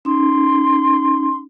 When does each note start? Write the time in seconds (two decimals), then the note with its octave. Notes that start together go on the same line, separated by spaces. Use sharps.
0.05 C#4 D#4 C6